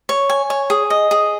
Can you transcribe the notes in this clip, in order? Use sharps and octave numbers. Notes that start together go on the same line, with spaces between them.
C#5
G#5
C#5
G#4
D#5
G#4